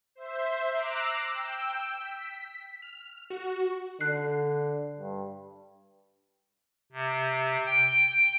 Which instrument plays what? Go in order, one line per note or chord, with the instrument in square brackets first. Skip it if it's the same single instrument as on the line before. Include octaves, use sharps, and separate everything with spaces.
[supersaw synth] C5 E5
A#5 D6 E6 F#6 C7
G5 E6
B6
F6
F#4
[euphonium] D3 [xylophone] F#6 C7
[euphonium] G2
[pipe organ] C3
G5